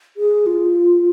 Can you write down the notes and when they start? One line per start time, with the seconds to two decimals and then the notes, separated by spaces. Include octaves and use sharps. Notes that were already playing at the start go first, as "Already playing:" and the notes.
0.17 G#4
0.46 F4